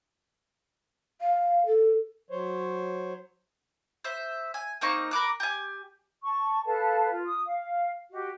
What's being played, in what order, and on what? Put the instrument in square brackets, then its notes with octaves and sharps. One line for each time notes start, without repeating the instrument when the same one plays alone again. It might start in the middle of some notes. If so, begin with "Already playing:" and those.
[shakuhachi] F5
A4
[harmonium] F#3 C5 C#5
[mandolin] C5 E5
G#5
A#3 C4 D#4 C#6
A#4 B5 D6 F#6
G4 G#5
[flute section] A5 C#6
A4 B4 F5 A5
F4
D#6
F5
F#4 G4 D#5